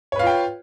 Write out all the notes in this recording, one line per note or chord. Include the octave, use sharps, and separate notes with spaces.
F4 B4 C#5 F5 G5